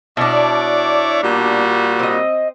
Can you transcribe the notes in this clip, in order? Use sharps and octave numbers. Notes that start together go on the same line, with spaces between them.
B2 D4 E4 C#5 D5
A#2 G3 F#4
C4 D#5